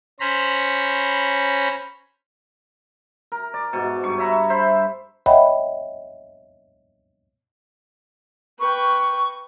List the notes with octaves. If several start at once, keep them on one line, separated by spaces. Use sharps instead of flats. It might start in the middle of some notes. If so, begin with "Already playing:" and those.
C#4 C5 A#5 B5
A#4
D5
G#2 B2
G2 C#6
C#5 E5 A#5 B5
C5 E5 B5
C#5 D#5 E5 F#5 G5 B5
B4 G5 C#6